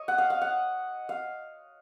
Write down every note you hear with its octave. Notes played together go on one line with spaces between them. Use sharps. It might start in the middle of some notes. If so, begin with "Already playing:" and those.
Already playing: C#5 D#5
F#5
F5
F5
F#5
F5